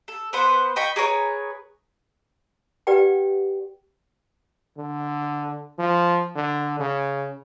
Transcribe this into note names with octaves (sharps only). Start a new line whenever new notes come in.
A4
B3 B4 C5 F#5
D#5 G5 B5 C#6
G#4 A#4 B4 C#5
G4 B4 D5 F#5 G5
D3
F3
D3
C#3